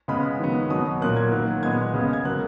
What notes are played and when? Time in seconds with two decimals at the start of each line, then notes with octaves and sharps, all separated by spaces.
0.08 C#3 G#3 B3 B5
0.40 D#3 F#3 B3
0.70 B2 F#3 B3 D#6
1.01 A#2 F#3 A#3 F#6
1.17 G#6
1.32 D#3 F#3 A#3
1.63 A#2 G#3 B3 G#6
1.94 C#3 G#3 B3
2.13 G#6
2.25 C#3 F#3 A#3 F#6